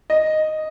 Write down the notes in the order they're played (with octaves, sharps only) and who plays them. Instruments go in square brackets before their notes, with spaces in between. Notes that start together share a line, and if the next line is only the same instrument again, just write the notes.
[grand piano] D#5